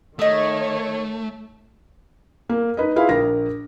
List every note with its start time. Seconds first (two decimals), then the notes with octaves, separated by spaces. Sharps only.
0.19 D#3 A3 C#5 D#5 D#6
2.49 A#3
2.77 D#4 B4 D#5
2.96 E4 F4 G#4 B4 F5
3.09 A#1 A#4 A#6